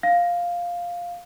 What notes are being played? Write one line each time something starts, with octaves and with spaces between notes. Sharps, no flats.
F5